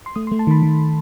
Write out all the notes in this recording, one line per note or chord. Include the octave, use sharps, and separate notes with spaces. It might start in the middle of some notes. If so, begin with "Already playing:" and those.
C6
A3 D#6
C6
A3
A5
D#3 B5
D#3